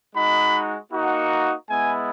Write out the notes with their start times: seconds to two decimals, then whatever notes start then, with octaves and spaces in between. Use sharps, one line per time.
0.15 G#3 D#4 F#4 B5
0.92 A#3 D#4 F#4
1.69 G#3 B3 E4 G#5